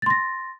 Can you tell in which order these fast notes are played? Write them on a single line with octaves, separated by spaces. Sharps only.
A6 C6 A#6